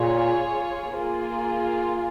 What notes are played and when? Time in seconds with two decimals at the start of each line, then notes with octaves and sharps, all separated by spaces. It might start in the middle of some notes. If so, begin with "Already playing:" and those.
Already playing: A#2 F4 G#4 C#5
0.95 A#3 F4 G#4